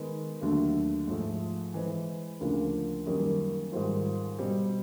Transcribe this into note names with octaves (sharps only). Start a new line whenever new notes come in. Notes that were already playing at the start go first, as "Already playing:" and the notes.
Already playing: D#3 G#3 B3
D#2 D3 F#3 A3
G#2 F3 A3
E3 G#3 C4
D2 C#3 F3 A#3 D4
F#2 D#3 G3 A#3
G#2 D#3 G3 C4 F4
B2 G3 C4